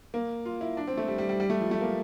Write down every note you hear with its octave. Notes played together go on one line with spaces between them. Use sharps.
A#3
F4
E4
D4
C4
A3
G3
G3
G3
G3
A3
F3
A3
A#3